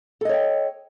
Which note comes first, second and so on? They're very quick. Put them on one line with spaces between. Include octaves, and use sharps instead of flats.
A4 D#5 C#5 G5